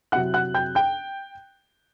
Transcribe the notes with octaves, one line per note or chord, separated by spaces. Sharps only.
C3 F#3 C4 E4 F#5 F#6
F#5 F#6
G5 G6
G5 G6